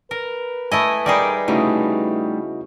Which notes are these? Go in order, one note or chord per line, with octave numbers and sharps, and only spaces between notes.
A#4 B4
A3 E4 D#5 E5 G#5
G3 D#4 G#4 A#4 D5
C#3 G3 A3 D#4 E4 F#4 D#5